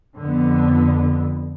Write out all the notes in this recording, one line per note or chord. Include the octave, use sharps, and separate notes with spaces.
F2 D3 B3